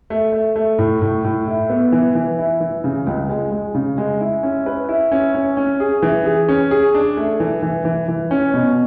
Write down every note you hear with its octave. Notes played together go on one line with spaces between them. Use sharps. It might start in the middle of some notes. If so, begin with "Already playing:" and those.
A3
A3
A3
A2
A2
A2
E4
B3
E3
E3
E4
E3
C#3
C#2
G#3
G#3
C#3
G#3
E4
C#4
B4
E4
C#4
C#4
C#4
G#4
E3
G#4
C#4
G#4
D4
A3
E3
E3
E3
E3
C#4
B2